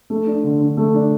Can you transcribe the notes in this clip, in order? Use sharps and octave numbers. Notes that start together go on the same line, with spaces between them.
A3
D4
D3
D3
A3
D4